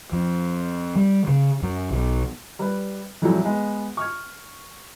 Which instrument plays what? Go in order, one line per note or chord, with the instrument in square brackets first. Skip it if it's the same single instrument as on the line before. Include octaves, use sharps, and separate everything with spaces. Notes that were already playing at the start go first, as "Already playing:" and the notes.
[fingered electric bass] F2
G3
C#3
F#2
B1
[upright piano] G3 B4
F2 A2 E3 F#3 G3 A3
G#3 B3
C#6 F6 G#6